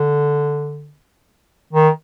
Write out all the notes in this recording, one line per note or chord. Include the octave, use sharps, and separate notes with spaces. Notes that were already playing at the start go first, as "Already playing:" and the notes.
Already playing: D3
D#3